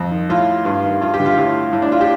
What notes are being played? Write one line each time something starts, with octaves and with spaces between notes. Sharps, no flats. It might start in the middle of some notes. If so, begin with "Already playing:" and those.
Already playing: F2
D#3
A2 F4
G2
D#3
G2 F4
G4
D3
F4
A2
A2
D4
F4
G4